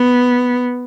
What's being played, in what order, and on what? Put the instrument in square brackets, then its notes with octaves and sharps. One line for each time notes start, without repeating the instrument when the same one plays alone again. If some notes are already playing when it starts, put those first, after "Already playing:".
Already playing: [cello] B3